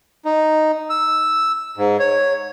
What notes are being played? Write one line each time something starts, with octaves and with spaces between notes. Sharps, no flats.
D#4
E6
G#2
C#5